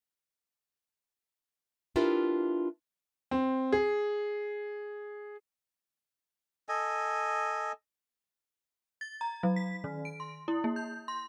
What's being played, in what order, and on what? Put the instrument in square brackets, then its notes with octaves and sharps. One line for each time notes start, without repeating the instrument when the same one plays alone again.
[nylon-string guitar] D4 E4 F4 G4 A#4 B4
[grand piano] C4
G#4
[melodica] A4 D#5 G#5
[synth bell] A6
A#5
F#3
B6
D#3
D7
C6
E4
A#3
G6
C6